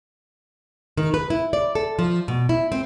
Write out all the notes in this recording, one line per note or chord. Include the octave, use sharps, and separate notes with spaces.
D#3
B4
E4
D5
A4
F3
B2
E4
C4